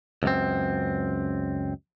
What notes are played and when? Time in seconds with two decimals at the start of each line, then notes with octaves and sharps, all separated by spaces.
0.23 C#2 F#2 C4